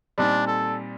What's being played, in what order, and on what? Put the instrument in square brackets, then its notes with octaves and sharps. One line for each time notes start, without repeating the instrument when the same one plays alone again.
[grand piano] A#2 G3 C4 D#4 [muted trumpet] D4
[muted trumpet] A4